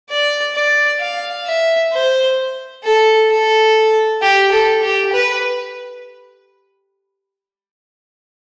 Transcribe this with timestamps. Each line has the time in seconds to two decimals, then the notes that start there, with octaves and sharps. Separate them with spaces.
0.10 D5
0.55 D5
1.00 F5
1.46 E5
1.93 C5
2.84 A4
3.30 A4
4.22 G4
4.52 A4
4.83 G4
5.13 B4